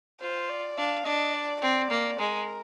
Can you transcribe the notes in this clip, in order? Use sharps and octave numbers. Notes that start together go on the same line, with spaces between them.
F4 C5
D5
D4 F5
D4 D#5
D5
C4 D5
A#3
G#3 A#4